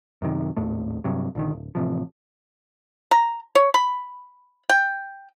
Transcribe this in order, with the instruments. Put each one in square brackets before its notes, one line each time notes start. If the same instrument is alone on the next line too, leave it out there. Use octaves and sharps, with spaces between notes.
[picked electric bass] F#2 C3 D#3
G#1 D#2 A2 A3
G2 C3 F#3
A#1 D3 D#3
D1
A1 C3 F3
[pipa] A#5
C#5
B5
G5